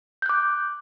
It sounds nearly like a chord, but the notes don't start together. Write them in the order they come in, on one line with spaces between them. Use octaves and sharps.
G6 F#6 D6